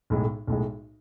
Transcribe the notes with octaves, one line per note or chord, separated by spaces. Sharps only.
B1 A2 G#3
B1 A2 G#3